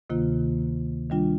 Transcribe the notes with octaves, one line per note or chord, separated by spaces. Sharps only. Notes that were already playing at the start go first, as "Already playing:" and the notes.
D2 C3 D#3 A#3 F4
D#3 G3 D4 F4